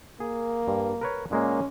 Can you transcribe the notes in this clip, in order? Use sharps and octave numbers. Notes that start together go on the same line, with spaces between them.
A#3 G#4
G2
A#4 B4 C#5
A#2 G#3 A#3 C#4